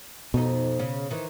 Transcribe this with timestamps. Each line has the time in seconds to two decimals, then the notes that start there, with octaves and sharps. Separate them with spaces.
0.34 F2 B2 D#4
0.79 C#3
1.11 D#3 E3